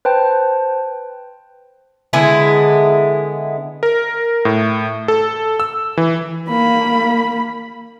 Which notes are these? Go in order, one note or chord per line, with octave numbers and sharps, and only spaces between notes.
B4 C5 G5 A5
D3 G#3 B3 E4
A#4
A2
A4
E6
E3
A#3 B5